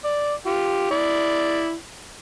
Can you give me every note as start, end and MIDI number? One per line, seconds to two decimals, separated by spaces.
0.04 0.33 74
0.46 0.86 65
0.46 0.86 67
0.91 1.73 64
0.91 1.73 74